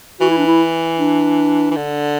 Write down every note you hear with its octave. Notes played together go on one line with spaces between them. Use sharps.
E3 F#4
E4
D4
E4
D4
E3
D3